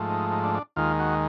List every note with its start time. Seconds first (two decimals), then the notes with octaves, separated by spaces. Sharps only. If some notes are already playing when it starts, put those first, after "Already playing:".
Already playing: G#2 F3 A3
0.09 D#4
0.31 D#4
0.44 D4
0.55 D4
0.76 D#2 D#3 G#3 F4
0.99 F#4